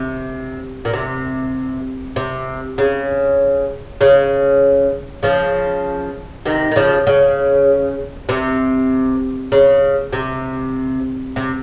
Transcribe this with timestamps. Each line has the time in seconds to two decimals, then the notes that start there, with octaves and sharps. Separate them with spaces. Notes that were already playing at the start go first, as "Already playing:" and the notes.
Already playing: C3
0.85 A#2
0.93 C3
2.16 C3
2.78 C#3
4.01 C#3
5.23 C#3 F3
6.45 C3 D#3
6.71 D#3
6.76 C#3 F3
7.07 C#3
8.29 C3
9.52 C#3
10.13 C3
11.36 C3